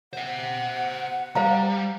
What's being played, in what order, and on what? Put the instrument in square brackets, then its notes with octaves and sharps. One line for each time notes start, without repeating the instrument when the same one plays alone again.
[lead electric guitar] C5 E5 [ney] F#5
[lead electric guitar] G3 [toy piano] C5 F5 A#5